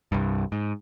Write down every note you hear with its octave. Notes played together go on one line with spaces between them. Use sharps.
C2 G2
G#2